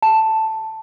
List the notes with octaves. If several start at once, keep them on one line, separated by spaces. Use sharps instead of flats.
A5